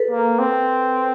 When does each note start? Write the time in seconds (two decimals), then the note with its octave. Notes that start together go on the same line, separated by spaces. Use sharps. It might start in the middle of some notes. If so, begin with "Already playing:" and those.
Already playing: A4 B4
0.11 A#3
0.39 C4